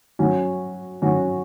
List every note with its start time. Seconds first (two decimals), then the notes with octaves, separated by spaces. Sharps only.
0.19 F#3 C#4 F#4
1.02 F#3 C#4 F#4